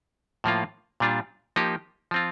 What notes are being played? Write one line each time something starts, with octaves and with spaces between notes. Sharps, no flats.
A2 F3 A#3 F4
A#2 G3 D4 F4
F3 A#3 D#4 G4
F3 C4 F4